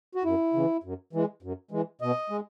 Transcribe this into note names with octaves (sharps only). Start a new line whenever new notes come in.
F#4
F#2 E4
C#3 E3
F#2
E3 G#3
F#2
E3 G#3
B2 D#5
G#3